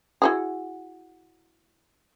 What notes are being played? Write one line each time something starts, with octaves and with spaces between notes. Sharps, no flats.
E4 F#4 G#4